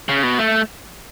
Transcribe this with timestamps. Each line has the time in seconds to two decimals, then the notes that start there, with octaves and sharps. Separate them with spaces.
0.09 C#3
0.23 B2
0.39 A3